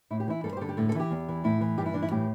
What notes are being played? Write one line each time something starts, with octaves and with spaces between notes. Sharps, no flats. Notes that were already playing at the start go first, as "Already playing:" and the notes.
A2 E4
G4
E3 E4
G2 A4
C5
G4
D3 A4
G4
A2 A4
A4
E3 G4
E2
E3
A2 E4
E3
G2 G4
E4
E3 D4
E4
A2 G4